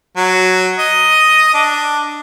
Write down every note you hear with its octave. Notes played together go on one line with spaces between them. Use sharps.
F#3
D#5
D4